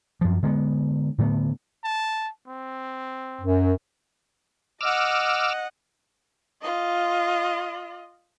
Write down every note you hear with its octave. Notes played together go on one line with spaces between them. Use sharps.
F#2 F3
D3 G#3 A#3 B3
A2 D3 A3 B3
A5
C4
F#2
D#5 F#5 D6 E6 F6
F4 D#5